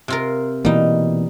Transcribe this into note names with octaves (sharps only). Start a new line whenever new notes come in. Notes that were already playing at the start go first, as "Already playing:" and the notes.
C3 F4 A#4
B2 E3 G3 A#3 D#4